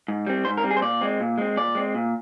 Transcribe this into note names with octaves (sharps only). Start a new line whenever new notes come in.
G#2
G3 C4
G#2 C5
A#4
G3 C4
G#4
C5
A#2 D5
G#3 C4
A#2
G#3 C4
A#2 D5
G#3 C4
A#2